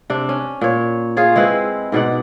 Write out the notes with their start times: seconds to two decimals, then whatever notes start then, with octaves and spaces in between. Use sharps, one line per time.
0.10 C3 D4
0.29 C#4
0.61 A#2 C#5
1.17 F4 G#4 C#5
1.36 G#3 C4 E4 B4
1.92 G#2 B2 D5 F#5